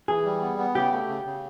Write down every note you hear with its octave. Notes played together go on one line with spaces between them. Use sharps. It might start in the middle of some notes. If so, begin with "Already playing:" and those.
E3 G#4
G3
B3
B3
C#3 G4
A3
C#3
C#3